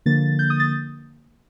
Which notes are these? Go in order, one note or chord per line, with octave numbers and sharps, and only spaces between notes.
D3 F3 A#3 A6
G6
D#6
A6